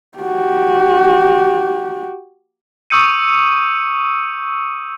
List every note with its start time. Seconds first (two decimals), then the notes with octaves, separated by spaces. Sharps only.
0.19 F#4 G4
2.90 C#6 D#6 E6 G6 C#7 D#7